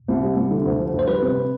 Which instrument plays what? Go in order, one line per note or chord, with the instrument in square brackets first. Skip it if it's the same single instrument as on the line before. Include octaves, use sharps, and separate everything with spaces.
[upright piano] C2
G3
C2
D3
D2
F3
D2
[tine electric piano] C5
[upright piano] G3 [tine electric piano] B4
[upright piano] C3